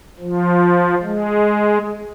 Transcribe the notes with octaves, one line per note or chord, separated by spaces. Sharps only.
F3
G#3